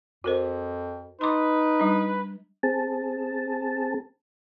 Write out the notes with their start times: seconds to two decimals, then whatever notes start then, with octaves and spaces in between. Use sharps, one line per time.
0.24 F2 F#4 A#4 C5
1.21 D#4 B4 C6 D6
1.80 G3 D4
2.63 C4 G#4 A5